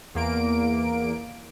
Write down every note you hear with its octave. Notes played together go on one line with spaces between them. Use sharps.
E2 A#3 D7